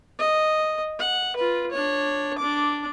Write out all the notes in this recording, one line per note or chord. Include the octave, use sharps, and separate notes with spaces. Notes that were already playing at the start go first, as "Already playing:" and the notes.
D#5
F#5
F4 B4
D4 C#5
D4 D6